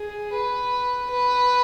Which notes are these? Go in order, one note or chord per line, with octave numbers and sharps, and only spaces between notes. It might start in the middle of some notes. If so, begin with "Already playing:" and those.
Already playing: G#4
B4
B4